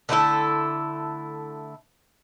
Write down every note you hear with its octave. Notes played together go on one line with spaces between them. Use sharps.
D3 A3 E4 A4